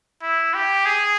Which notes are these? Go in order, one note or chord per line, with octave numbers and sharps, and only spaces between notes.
E4
G4
G#4